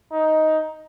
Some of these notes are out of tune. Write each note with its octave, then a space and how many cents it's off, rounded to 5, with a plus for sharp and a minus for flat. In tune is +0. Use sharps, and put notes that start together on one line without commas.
D#4 +10